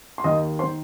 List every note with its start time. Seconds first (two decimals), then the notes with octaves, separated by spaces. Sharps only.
0.18 C6
0.24 D#2 D#3 D#5 D#6
0.59 C5 C6
0.63 D#3